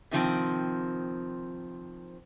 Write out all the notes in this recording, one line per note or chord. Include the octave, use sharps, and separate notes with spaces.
C3 D#3 F3 C4